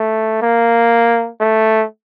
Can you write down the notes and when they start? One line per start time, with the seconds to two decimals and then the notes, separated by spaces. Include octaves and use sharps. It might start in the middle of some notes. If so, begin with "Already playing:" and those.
Already playing: A3
0.42 A#3
1.40 A3